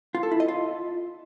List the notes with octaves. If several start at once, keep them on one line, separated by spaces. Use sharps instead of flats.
F4
A4
E4
D#5
F4